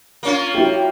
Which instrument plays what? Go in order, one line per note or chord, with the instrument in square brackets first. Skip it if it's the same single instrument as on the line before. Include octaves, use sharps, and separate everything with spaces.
[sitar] A#3 C#4 F4
[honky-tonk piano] F#3 E4 G4